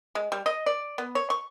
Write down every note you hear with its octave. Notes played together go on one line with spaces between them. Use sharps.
G#3
G3
D#5
D5
B3
C#5
C#6